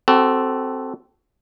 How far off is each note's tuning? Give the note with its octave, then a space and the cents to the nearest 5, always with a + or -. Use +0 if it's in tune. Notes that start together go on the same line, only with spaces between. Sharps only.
C4 +0 F#4 +30 A4 +0